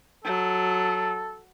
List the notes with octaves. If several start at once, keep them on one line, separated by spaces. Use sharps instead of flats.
F#3 A4